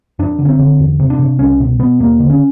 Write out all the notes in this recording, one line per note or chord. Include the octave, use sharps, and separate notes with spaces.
F2 D4
D3
C#4
C4
D3
E2
C3
D4
C3
C2 C#4
B2
B2 B3
D#2 A#3
D3
C#4